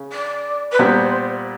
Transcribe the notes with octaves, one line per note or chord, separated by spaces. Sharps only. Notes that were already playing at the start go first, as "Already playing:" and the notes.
Already playing: C#3
D5
B4
A#2 G3 B3 C5